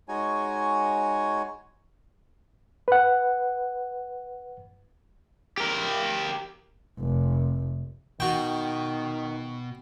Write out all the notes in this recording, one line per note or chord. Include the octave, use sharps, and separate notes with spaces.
G#3 D#4 F#4 C#5 G#5
B4 F#5
G4 A#4
F1
B2 D#3 F#4 G5